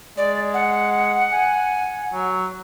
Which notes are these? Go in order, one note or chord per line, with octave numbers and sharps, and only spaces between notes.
G#3 D5
F#5
G#5
F#3